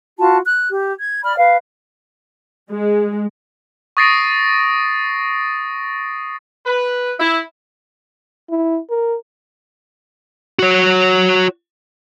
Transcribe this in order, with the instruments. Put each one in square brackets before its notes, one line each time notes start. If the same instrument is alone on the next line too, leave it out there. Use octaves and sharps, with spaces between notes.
[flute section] F4 F#4 A5
F#6
G4
G#6
D5 B5 F6
B4 F5
[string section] G#3
[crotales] C#6 D#6 A6 A#6 C7 D7
[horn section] B4
E4
[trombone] E4
A#4
[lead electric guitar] F#4 C#5